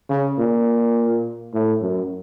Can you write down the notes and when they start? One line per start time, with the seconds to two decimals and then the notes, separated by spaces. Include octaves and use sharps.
0.09 C#3
0.38 A#2
1.53 A2
1.82 F#2